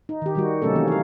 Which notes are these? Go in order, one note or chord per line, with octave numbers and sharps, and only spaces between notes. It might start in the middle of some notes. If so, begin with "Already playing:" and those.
D#4
D#3 G4
D#3 G3 F#4
C3 F#3 A3 C#4 D#4 A4
E3 A#3 C#4
A#4 F5